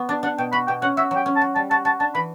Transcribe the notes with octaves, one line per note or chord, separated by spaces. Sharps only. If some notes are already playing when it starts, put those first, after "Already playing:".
Already playing: B3 F#4
D4 D5
D4 F#5
B2 G5
F#4 B5
B2 G5
C#4 F#5
F#4 E5
F#3 G5
C#4
A5
F#4
G3 A5
F#4 A5
F#4 A5
D4 A5
E3 B5